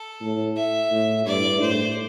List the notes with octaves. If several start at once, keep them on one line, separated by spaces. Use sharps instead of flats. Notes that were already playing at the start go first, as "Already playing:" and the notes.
Already playing: A4
A2
E5
A2
G2 D5
A2 C5